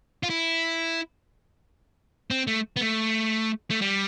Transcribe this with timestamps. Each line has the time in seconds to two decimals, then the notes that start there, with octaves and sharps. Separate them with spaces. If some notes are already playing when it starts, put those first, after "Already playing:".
0.23 F4
0.30 E4
2.30 C4
2.47 A3
2.76 B3
2.81 A3
3.70 A3
3.81 G3